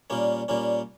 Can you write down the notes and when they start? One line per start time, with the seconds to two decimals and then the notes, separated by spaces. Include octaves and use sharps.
0.10 A#2 G3 A#3 C#4
0.48 A#2 G3 A#3 C#4